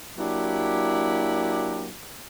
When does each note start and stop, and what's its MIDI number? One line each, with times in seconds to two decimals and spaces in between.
0.18 1.91 54
0.18 1.91 58
0.18 1.91 62
0.18 1.91 64
0.18 1.91 67